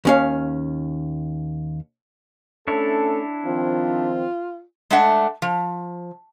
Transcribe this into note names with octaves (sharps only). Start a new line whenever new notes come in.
D#2 C#4 F5
A3 C#4 D4 E4 A4 C#5
D#3 F3 C4 F4
G#3 A3 D4 E5 F#5
F3